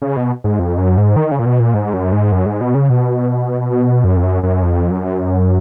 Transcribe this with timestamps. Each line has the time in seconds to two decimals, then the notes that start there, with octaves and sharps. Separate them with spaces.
0.02 C#3
0.16 B2
0.44 G#2
0.59 F2
0.78 F#2
0.97 G#2
1.16 D#3
1.31 C#3
1.39 A#2
1.46 B2
1.60 A#2
1.74 G#2
1.94 F#2
2.12 G#2
2.32 F#2
2.46 G#2
2.61 B2
2.75 C#3
2.90 B2
4.04 F#2
4.17 F2
4.23 F#2
4.43 F#2
4.62 F2
4.91 F#2